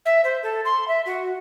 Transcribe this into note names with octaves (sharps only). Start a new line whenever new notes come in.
E5
C5
A4
C6
E5
F#4